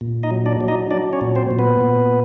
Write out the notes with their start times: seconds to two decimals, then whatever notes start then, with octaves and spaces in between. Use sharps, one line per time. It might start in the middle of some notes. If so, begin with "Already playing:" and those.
0.01 A#2
0.23 D#4 D#5
0.31 F#3
0.46 D4 D5
0.61 F#3
0.68 D#4 D#5
0.91 F#3 D4 D5
1.13 C#4 C#5
1.21 A#2
1.36 C4 C5
1.51 A#2
1.59 B3 B4
1.81 A#2